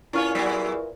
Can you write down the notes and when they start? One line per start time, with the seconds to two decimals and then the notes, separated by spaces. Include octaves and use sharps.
0.13 E2 A#2 C#4 E4 F4 C#5 C#6 F6
0.35 F#3 B3 G#4